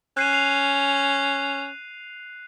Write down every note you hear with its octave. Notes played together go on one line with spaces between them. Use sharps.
C#4 F#6 C7 D#7
C7 F7